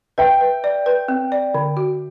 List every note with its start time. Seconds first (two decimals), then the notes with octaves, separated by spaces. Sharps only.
0.18 B4 E5 G5
0.41 B4
0.64 D5
0.86 B4
1.08 C4
1.32 D5
1.54 D3
1.77 F#4